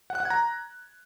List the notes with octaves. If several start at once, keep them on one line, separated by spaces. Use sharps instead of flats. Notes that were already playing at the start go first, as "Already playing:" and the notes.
F#5
F#6
F#5
G#6
A#5